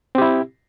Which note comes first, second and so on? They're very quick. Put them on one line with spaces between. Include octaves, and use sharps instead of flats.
C4 G4 E4